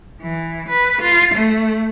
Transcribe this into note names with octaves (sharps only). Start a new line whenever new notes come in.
E3
B4
F4
A3